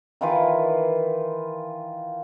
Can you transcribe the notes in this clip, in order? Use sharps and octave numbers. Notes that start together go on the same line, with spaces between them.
D#3 E3 F4 B4